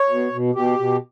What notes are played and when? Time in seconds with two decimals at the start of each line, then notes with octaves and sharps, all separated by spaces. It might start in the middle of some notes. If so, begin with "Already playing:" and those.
Already playing: C#5
0.09 B2
0.33 B2
0.55 B2 G4
0.79 B2